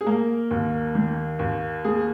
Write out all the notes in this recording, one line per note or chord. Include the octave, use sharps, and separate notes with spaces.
G#4
A#3 A#4
D#2
D#3
D#2
A#3 G#4